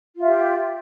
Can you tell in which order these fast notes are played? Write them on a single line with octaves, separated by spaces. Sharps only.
F4 E5 G4